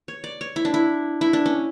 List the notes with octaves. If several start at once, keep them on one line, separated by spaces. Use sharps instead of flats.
C#5
D5
C#5
E4
D4
E4
E4
D4
C#4